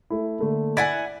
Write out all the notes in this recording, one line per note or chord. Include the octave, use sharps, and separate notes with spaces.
A3 E4
D3 A3 A#3
E4 D5 F#5 G#5 A6 B6